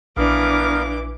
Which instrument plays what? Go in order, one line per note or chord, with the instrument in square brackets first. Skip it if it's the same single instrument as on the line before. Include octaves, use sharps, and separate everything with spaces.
[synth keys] A#1 [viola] E3 D6 [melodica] B3 A#4 F5 [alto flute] D4